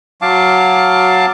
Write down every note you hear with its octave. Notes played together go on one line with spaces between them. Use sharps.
F#3 F5 A5 D6